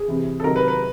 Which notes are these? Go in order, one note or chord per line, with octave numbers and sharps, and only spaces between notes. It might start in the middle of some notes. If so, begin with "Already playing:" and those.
Already playing: G#4
C3 E3
A4
C3 D#3 F#3 A#4
B4
B4